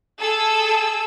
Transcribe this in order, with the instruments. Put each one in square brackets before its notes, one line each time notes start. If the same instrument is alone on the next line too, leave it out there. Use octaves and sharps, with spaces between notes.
[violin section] G#4 A4 E6